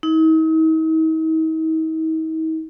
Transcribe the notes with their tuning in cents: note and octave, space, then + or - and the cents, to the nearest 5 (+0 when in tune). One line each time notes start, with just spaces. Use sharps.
D#4 +45